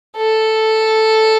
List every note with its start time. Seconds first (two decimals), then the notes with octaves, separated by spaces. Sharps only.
0.17 A4